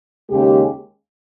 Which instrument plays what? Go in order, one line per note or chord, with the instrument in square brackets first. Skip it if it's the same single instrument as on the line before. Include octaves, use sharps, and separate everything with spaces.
[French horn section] D#2 C#3 G#3 G4